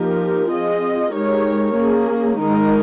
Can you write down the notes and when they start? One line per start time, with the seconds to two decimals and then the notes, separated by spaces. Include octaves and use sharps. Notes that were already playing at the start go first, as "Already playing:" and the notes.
Already playing: F3 A#3 D#4 G4 A#4
0.50 C4 F4 G#4 D#5
1.13 G#3 D#4 G4 A#4 C#5
1.77 A#3 C#4 G#4
2.41 D#3 G#3 D#4 A#4